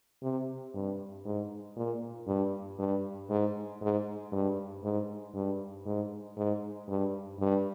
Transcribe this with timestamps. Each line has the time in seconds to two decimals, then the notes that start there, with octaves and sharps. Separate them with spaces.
0.22 C3
0.74 G2
1.25 G#2
1.76 A#2
2.27 G2
2.79 G2
3.30 G#2
3.81 G#2
4.32 G2
4.83 G#2
5.35 G2
5.86 G#2
6.37 G#2
6.88 G2
7.39 G2